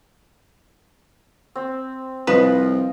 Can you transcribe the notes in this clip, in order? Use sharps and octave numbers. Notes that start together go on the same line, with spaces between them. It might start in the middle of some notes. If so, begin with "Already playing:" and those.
C4
C2 F3 B4 D#5